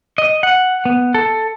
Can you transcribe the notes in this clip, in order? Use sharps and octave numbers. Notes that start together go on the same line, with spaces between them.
D#5
F#5
B3
A4